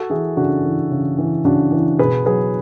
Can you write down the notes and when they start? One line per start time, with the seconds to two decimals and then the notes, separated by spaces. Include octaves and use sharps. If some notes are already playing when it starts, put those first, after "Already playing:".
Already playing: F#4 A4
0.10 E3 E4 G#4
0.37 C#3 D4 F#4
0.65 E3
0.91 C#3
1.19 E3
1.45 C#3 D4 F#4
1.72 E3
1.99 B2 G#4 B4
2.26 F#3 G#4 B4